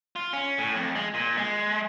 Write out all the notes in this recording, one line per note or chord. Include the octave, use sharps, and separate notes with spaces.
F4
C#4
A2
F2
G#3
A#2
G#3